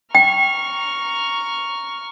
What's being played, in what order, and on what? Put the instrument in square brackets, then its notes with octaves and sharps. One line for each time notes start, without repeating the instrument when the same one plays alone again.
[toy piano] G5 [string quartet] A#5 C#6 F6